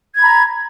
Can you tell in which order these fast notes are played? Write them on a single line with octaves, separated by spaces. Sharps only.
G#6 B5 A#5